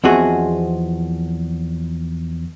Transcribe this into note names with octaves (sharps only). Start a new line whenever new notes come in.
E2 F3 C4 F#4 G#4 D#5